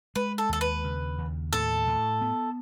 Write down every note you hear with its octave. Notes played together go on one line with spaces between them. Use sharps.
G#3 B4
A4
D#2 A4
B4
C#3
D#2
A2 A4
A2
B3